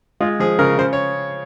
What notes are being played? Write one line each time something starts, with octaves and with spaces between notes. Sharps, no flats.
G#3 F4
F3 G#4
C#3 A#4
C#3 C5
C#5